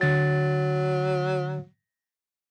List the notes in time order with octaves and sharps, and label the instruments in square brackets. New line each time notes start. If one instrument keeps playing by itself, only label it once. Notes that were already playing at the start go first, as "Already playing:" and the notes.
[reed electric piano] D3 A6 [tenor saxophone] F#3